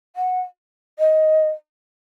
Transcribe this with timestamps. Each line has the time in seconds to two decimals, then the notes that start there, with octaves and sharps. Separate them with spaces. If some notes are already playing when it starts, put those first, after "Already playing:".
0.16 F#5
0.99 D#5